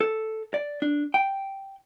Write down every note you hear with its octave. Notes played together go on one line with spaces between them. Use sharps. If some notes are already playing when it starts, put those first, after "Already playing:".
A4
D5
D4
G5